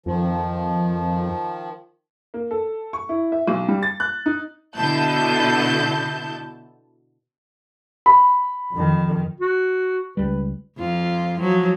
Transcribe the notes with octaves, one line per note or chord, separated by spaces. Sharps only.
F2 D#3 F3
A#3
A4
C#6
E4
E5
B1
G3
A6
F#6
D#4
B2 D3 E4 A5 G6
B5
F2 D#3
F#4
C#2 G3 B4
F2 F4
F3 F#3